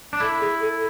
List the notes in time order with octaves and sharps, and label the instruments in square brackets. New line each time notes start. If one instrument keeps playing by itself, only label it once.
[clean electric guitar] D4
[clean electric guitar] E4 [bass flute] A4
[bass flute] G#4
A4